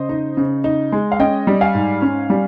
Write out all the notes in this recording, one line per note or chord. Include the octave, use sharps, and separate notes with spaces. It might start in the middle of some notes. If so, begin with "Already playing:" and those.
Already playing: C#3 C5 D#5
D#4
C#3
D#4
G#3
F5
C#4 D#5 G5
G3
F5 G#5
G#2
C#4
G3